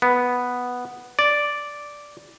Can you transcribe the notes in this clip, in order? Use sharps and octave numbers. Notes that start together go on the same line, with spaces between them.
B3
D5